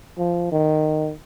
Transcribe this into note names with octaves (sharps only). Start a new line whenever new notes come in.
F3
D#3